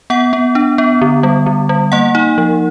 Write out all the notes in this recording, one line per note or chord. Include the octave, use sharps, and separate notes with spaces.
B3 F#5
B3
D4
B3
D3
G3
D3
G3
A#3 F#5
D#4
F3